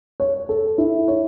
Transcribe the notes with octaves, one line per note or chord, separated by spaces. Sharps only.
C#5
A4
E4
C#5